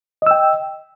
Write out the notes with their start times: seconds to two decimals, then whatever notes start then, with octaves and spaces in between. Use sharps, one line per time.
0.22 D#5
0.27 E6
0.31 G5